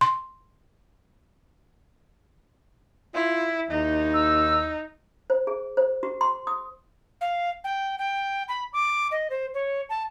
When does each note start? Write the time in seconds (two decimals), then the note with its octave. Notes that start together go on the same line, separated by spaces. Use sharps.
0.01 C6
3.14 E4 F4
3.70 D#2 D#4
4.14 E6
5.30 C5
5.47 G#4
5.77 C5
6.03 F#4
6.21 C6
6.47 D#6
7.21 F5
7.64 G5
7.98 G5
8.49 B5
8.73 D6
9.12 D#5
9.30 C5
9.54 C#5
9.90 A5